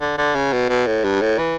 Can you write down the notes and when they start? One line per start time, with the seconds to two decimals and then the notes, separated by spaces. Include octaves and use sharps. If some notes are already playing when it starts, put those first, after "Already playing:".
0.01 D3
0.18 D3
0.35 C#3
0.53 B2
0.69 B2
0.87 A2
1.04 G2
1.21 A2
1.38 E3